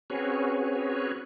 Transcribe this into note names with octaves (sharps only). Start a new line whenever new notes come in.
C4 C#4 F#4 G#4 B4 C#5